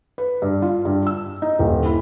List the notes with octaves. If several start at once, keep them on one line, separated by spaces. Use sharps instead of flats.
B4
G2
F4
G2
E6
D#4
D#1
E4